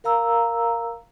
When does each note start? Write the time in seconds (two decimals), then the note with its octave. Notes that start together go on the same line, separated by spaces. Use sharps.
0.04 A#4 F5 A#5 E6